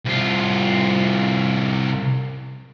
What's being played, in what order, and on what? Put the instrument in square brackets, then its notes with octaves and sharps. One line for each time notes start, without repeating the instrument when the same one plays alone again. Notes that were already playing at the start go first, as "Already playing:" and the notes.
[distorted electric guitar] C2 F4